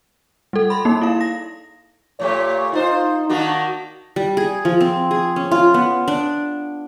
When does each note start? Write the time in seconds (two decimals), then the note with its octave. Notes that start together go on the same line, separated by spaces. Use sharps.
0.53 G3 A4
0.70 B5 C6
0.85 A#3 D#4
1.02 E4 F5
1.21 A#6
2.20 A#2 A3 G4 C#5
2.73 D#4 F4 C5
3.29 D#3 A#3 D4 F#4
4.16 G3
4.37 G#4
4.65 F3
4.81 C4
5.11 G#4
5.36 C#4
5.51 F4
5.74 B3
6.08 D4